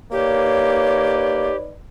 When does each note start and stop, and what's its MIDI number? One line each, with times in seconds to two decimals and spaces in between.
0.12 1.50 58
0.12 1.76 63
0.12 1.56 67
0.12 1.76 71
0.12 1.56 73
0.12 1.76 74